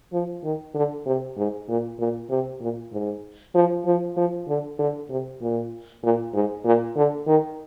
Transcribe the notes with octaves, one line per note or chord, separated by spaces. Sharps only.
F3
D#3
D3
C3
G#2
A#2
A#2
C3
A#2
G#2
F3
F3
F3
D3
D3
C3
A#2
A#2
G#2
A#2
D3
D#3